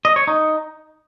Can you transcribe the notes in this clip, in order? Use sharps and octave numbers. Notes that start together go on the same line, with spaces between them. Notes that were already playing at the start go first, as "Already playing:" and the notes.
D#5
C#5
D#4